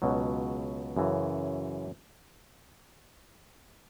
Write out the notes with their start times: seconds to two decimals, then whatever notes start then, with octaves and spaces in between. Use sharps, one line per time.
0.02 C#2 B2 F#3
0.96 F#2 C#3 E3